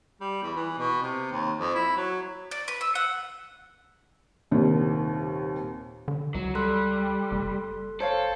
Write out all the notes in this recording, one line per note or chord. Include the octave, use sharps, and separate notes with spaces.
G3
E2
E3
B2
C3
D#2
F2
E4
F#3
D5
B4
E6
F#5
D#1 D#2 C3 D#3
D3
C#2 F#3
G3 A4 C6 F#6
F#1
A4 C5 C#5 F5